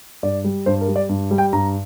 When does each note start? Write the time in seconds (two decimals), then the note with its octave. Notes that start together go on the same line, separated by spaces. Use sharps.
0.23 G2 D5
0.44 G3
0.66 G2 C5
0.81 A#4
0.88 G3
0.96 D5
1.09 G2
1.31 G3
1.38 G5
1.53 G2 A#5